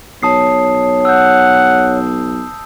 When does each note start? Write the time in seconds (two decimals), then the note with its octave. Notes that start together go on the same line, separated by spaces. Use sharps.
0.23 B1 C#5 A5 D#6 C7
1.05 F#5 E6 G6